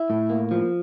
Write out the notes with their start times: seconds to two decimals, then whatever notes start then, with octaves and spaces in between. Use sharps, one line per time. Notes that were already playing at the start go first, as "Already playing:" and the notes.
Already playing: E4
0.10 A2
0.30 A#3
0.51 F3